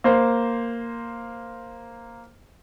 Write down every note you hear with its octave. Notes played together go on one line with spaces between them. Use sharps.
A#3 C5